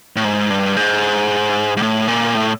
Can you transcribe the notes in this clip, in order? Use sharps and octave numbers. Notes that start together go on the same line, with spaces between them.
A2
G#2
G2
G#2
G#2
A2
A#2
A2